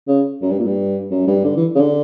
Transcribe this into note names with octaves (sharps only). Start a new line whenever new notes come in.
C#3
F#2
G2
A#2
G2
F#2
G2
D3
E3
C#3
D3